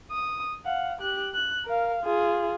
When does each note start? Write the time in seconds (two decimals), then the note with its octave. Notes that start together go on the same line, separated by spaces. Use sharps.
0.11 D#6
0.65 F5 F#5
1.00 G4 F#6
1.34 F#6
1.66 A#4 F5
2.03 F4 G#4